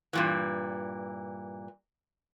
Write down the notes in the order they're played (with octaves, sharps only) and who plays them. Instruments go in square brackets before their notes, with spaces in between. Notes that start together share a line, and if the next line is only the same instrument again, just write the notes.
[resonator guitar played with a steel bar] G2 A#2 E3